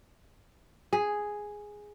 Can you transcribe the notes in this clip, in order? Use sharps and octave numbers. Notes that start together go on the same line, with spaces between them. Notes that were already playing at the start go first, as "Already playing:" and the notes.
G#4